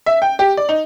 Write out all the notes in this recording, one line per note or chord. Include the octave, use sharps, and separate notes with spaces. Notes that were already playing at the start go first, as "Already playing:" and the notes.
E5
G5
G4
D5
D#4